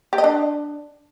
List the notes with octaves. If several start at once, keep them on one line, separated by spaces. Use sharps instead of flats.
G4
D#5
D4